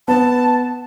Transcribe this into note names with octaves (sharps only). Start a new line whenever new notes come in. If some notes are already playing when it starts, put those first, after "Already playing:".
B3 A5